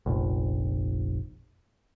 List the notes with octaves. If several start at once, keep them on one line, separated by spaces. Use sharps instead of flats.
F1 A#1